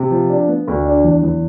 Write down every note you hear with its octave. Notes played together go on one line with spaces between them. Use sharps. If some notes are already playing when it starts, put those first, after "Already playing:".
Already playing: C3
F3
D4
B3
D2
D4
E2
E2